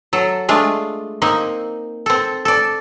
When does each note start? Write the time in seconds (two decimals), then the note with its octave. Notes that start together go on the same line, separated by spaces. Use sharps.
0.13 F#3 A4
0.49 G#3 A3 D4 F4
1.22 A#3 C4 D#4
2.06 C4 A4
2.45 A4 D5